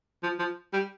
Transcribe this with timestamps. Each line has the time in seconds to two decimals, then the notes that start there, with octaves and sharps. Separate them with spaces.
0.23 F3
0.39 F3
0.73 G3